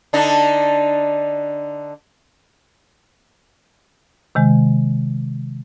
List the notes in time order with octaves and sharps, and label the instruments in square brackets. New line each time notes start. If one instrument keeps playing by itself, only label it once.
[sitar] D3 D4 D#4
[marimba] C3 D#3 G#3